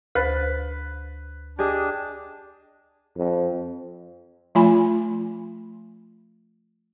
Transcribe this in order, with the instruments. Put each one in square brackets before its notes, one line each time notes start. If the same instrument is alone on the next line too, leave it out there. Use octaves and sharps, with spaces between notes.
[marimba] D2 C5 A6 [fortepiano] B4
[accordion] D4 [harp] G4 G#4 D#5
[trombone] F2
[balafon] F3 A3 F4 G#5 B5